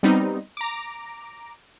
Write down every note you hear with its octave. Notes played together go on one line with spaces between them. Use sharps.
G3 B3 C4 D#4
A#5 D6